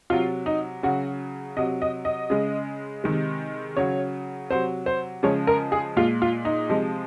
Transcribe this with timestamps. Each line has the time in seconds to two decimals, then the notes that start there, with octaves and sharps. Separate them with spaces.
0.10 C3 F#3 F4
0.46 D#4
0.83 C#3 F#3 F#4
1.57 C3 F#3 D#5
1.82 D#5
2.05 D#5
2.30 C#3 G#3
3.04 C3 D#3 G#3
3.77 C#3 F#3 C#5
4.50 C3 F#3 C5
4.86 C5
5.23 C#3 F3 G#3 C#5
5.47 A#4
5.72 G#4
5.96 A#2 G#3 F4
6.22 F4
6.45 D#4
6.69 C3 F3 G#3